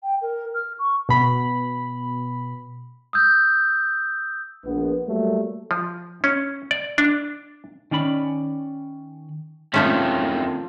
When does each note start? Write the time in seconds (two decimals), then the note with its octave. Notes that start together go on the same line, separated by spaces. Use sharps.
0.03 G5
0.22 A#4
0.54 F6
0.79 C#6
1.09 B2 B5
3.13 D#6 E6 G6
4.65 A#1 B3
5.07 F#3 G3 A3 A#3
5.71 F3
6.24 C#4
6.71 D5
6.98 D4
7.91 D#3 C#4 D5 B5
9.74 F2 D#3 F3 A3 C#4 F4 A4 C5